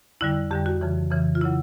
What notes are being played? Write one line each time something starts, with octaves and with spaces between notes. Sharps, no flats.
F2 D3 G3 E4
F2 D3 G3 G4
F#4
F2 C#3 E3
F2 C#3 E3
F4
C#3 F#3 E4